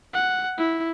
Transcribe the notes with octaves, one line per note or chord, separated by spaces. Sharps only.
F#5
E4